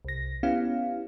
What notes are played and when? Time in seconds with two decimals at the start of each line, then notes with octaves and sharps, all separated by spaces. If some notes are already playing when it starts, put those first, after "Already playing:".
0.05 C2 A#6
0.43 B3 C#4 E4 G4 F5